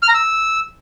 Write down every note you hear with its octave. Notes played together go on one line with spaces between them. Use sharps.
F6
A#5
E6